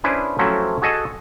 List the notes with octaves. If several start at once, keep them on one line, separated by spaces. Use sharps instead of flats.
C#4 D4 E4 G#4 B4 C5
F3 F#3 A3 C4 C#4 E4
F#4 G#4 A4 D#5 F#5